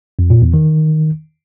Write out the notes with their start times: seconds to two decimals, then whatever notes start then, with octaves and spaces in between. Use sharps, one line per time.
0.19 F2
0.30 A#2
0.42 E2
0.54 D#3